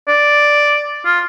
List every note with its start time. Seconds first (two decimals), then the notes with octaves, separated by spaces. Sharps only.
0.08 D5
1.05 F4